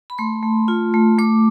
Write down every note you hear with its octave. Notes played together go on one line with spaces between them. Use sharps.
B5
A3 C6
A3
F4
A3
A3 D6